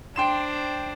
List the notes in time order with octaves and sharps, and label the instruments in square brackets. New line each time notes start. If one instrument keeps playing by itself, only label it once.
[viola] D4 C5 [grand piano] G5 C6 E7